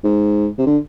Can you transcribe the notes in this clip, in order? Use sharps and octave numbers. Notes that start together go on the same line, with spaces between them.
G#2
C3
D3